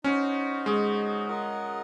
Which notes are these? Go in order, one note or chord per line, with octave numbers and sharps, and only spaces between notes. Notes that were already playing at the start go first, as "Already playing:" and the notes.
C#4 D#4 F#4 C5
G#3
F4 A#4 D#5 F#5